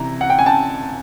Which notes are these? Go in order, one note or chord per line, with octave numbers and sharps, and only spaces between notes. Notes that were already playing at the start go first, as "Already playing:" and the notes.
Already playing: C3 E3 A#5
F#5
G5
G#5
G5 A5